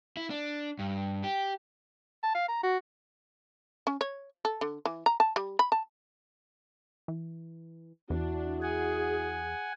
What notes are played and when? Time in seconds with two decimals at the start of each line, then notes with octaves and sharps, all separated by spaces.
0.17 E4
0.30 D4
0.79 G2
1.24 G4
2.23 A5
2.34 F5
2.49 A#5
2.63 F#4
3.87 C#4
4.01 C#5
4.45 A4
4.61 D3
4.85 E3
5.06 A#5
5.20 A5
5.36 G3
5.59 B5
5.72 A5
7.08 E3
8.10 E2 D4 E4 F#4
8.62 G#4 F#5 G#5